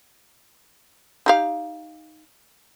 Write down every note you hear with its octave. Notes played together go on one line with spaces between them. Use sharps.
D#4 G4 F5